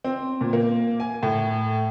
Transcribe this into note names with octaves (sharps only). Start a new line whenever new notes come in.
C4
A#2
A#3
G#5
A2